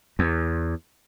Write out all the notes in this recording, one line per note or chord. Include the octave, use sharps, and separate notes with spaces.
E2